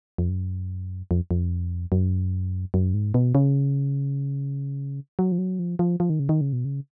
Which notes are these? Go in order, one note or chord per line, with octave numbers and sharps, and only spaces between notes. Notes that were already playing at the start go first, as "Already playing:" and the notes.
F2
F#2
F2
F2
F#2
F#2
G#2
B2
C#3
F#3
F3
F#3
F3
F3
F3
D#3
C#3
D#3
C#3
B2
C#3